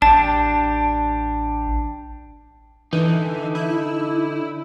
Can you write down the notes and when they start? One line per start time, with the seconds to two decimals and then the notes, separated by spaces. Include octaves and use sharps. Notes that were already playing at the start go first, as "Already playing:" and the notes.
0.02 A1 D4 G4 A5
2.93 D3 E3 D#4
3.55 E4